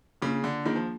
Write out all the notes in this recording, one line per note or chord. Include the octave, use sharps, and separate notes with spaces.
C#3 A#3 D4 F4 G#4
D3
D#3 A#3 D4 F4 G#4
F3